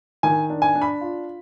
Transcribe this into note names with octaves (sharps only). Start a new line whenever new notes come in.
D#3 G#5
D4
G#5
D4
B5
F4